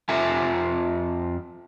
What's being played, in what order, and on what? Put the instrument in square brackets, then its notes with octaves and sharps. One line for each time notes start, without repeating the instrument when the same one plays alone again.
[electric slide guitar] F2 F4 A4 E5 G#5